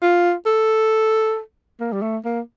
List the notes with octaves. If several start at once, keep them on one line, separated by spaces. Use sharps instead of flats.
F4
A4
A#3
G3
A3
A#3